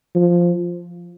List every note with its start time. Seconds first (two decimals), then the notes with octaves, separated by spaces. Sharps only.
0.15 F3